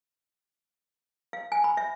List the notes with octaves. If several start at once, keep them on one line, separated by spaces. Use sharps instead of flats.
F5
G#5
B5
E5